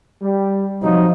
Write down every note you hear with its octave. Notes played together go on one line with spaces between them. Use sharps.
G3
C3 F3 F#3 D#4